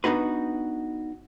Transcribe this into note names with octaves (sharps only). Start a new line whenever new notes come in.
B3 D4 D#4 F#4 B4